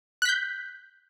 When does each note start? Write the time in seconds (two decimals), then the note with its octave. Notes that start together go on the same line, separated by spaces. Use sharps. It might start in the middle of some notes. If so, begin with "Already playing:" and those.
0.22 F#6
0.25 B6
0.29 G6